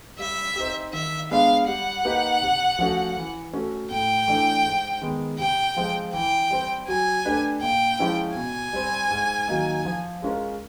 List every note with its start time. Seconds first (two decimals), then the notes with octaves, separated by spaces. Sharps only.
0.19 G3 E5
0.56 C4 D#4 G4
0.93 D#3 E5
1.31 G#3 B3 D4 F5
1.67 G3 F#5
2.05 A#3 D#4 G4 B4
2.42 C3
2.79 F3 A3 C#4 F#4
3.17 E3
3.53 A3 C#4 F#4
3.91 A2 G5
4.28 E3 A3 D4
4.65 G#2
5.02 D#3 G#3 B3
5.39 C3 G5
5.77 F3 G#3 C4
6.13 E3 G5
6.50 G3 C4
6.87 F#3 G#5
7.25 A3 D4 G4 B4
7.62 A#2 G5
7.99 F3 G#3 C#4 E4
8.36 B2 G#5
8.73 G3 C4
9.10 G#2
9.48 D#3 F#3 A#3 D#4
9.85 F3
10.22 G#3 C#4 F4 A#4